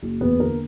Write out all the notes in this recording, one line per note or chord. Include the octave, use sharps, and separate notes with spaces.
F#1
E2 B3 B4
D3 A#3 A#4